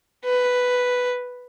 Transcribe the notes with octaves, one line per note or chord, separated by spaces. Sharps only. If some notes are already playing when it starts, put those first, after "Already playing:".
B4